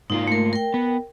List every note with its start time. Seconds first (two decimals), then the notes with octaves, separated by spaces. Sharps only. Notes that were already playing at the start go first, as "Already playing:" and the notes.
0.10 G#2 A#3 D#4 F4
0.27 A3 A#4
0.53 A#4 G5
0.74 B3